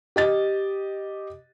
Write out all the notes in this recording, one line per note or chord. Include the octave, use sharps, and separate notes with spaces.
G4 D#5 A6